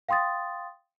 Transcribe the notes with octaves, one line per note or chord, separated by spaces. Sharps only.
F5 G5 C6 D#6 A6